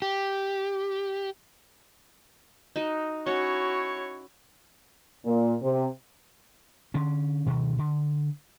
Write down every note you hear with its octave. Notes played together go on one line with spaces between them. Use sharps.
G4
D#4 F#4 D#5
C#4 E4 F#4 C#5
A#2
C3
D3 C#4
D2 B2 D#3
D3